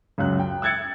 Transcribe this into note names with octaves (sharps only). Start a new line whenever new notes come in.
C#2 F#2 F#6
G5
E6 F#6 G#6 A6 C#7